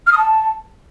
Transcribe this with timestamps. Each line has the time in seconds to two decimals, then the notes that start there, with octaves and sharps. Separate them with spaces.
0.07 F6
0.12 D#6
0.18 A5